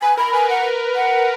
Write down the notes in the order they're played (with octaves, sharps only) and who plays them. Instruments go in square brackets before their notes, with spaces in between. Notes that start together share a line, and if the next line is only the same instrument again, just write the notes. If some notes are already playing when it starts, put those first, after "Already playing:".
[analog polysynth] B4 [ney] G#5
[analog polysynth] A#4 [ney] B5
[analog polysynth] B4 [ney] G#5
[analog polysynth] A#4 [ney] F#5
[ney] F#5